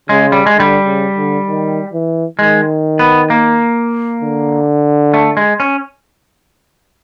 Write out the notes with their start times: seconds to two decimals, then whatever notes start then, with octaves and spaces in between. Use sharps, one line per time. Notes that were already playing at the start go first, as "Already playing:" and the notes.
0.09 C#3 G#3
0.32 G3
0.46 G#3
0.56 D3 G3
0.85 C#3
1.17 D3
1.48 D#3
1.93 E3
2.39 D#3 G#3
2.99 B3
3.30 A#3
4.21 D3
5.14 A3
5.37 G#3
5.60 C#4